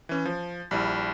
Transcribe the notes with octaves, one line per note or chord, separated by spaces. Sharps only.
E3 C#4
F3
A#1 G3 E4